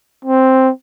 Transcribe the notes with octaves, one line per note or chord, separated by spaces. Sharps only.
C4